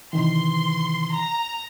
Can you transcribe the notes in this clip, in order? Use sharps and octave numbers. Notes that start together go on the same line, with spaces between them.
C3 D#3 E3 C6
A#5